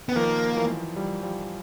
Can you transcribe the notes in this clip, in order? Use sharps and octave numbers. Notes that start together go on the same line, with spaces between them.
B3
D#3 F3 A#3
E3 F#3
F3 G3
F3 G3